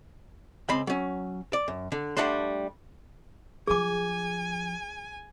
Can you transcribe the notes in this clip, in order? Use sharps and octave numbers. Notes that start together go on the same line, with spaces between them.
C#2 C4 B5 C6
F#3 C#4
D5
F#2
D3
G3 A3 D4 F#5 A5 C6
D3 F3 G#4 G#5 D6